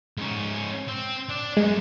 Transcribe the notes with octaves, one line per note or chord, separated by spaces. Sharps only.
G#2 C#4
C4
D4
F#2 G#3